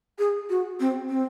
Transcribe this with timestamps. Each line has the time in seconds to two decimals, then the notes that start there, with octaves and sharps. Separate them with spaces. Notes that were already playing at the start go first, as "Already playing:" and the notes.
0.19 G#4
0.50 F#4
0.80 C4
1.09 C4